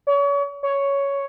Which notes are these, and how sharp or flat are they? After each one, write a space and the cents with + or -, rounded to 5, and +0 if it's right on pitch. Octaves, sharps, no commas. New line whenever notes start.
C#5 +35
C#5 +5